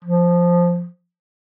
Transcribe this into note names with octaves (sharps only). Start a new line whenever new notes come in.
F3